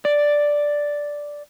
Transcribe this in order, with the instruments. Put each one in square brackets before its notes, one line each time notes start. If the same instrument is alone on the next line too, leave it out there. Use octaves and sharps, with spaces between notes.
[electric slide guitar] D5